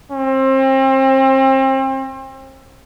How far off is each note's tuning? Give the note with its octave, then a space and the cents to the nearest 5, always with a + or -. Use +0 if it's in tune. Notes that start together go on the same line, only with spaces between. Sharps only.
C4 +35